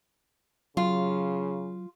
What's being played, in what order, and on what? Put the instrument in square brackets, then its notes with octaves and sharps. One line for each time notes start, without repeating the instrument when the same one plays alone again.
[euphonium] C#3 [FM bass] F#3 [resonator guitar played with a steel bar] F4